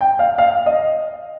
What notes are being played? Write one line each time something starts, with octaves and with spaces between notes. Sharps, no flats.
G5
F5
F5
D#5